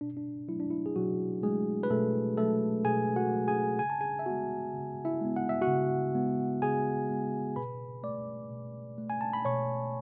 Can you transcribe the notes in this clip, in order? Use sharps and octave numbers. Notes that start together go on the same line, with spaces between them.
B2 D4
D4
F#3 A3 E4
D4
E4
G#4
B2 F#3 F#4
F#3 G#3 A3 G#4
B4
B2 A3 A4
F#3 A3 A4
B2 G#4 G#5
F#4 F#5
F#3 A3
G#4 G#5
C#3 G#5
A5
G#4 G#5
E5
G#3 B3 F#4 F#5
C#3
E4 E5
G#3 B3
F#5
E5
F#4 F#5
C#3
G#3 B3
C#3 G#4 G#5
G#3 B3
B2 B4 B5
A3 D5 D6
B2
A3
G#5
A5
B5
B2 C#5 C#6